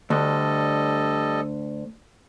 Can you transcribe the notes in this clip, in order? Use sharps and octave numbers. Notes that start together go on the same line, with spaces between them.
D2 G3 A4 D#5